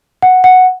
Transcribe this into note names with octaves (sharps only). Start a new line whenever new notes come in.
F#5
F#5